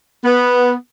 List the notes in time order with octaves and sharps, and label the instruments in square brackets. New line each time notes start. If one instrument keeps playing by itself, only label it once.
[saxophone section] B3